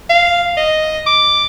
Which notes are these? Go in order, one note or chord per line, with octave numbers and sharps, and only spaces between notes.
F5
D#5
D6